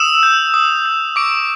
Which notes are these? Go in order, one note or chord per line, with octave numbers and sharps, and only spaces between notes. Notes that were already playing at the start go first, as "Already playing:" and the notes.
Already playing: D#6 E6 E7
G6
D#6
G6
C#6 D6 D7